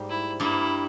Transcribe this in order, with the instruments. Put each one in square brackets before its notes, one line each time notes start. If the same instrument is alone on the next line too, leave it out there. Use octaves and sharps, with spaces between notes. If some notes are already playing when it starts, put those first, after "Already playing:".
Already playing: [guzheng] G#2 G3 A#3
[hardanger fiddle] E4
[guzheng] G2 G3 A#3 [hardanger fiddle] E4